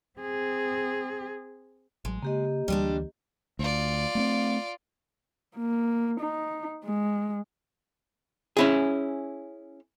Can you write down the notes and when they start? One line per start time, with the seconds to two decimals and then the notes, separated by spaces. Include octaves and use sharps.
0.19 C4 G#4
2.05 A1 F#3 G#3
2.23 C#3 A#3 G4 D#5
2.68 D2 E3 G3 G#3 D4
3.59 D2 F4 D5
4.15 A3 B3 C4
5.56 A#3
6.19 D#4
6.85 G#3
8.57 C#4 E4 G#4